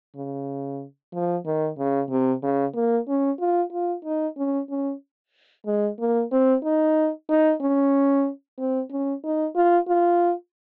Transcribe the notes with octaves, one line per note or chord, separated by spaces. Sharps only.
C#3
F3
D#3
C#3
C3
C#3
A#3
C#4
F4
F4
D#4
C#4
C#4
G#3
A#3
C4
D#4
D#4
C#4
C4
C#4
D#4
F4
F4